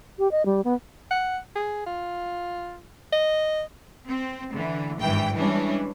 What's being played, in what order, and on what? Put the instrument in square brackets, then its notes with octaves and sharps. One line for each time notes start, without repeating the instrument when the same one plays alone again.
[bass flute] G4
D#5
G3
B3
[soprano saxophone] F#5
G#4
F4
D#5
[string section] C4
D3 E3
G#1 G2 E3 G5
E3 G3 G#3 C#4 D4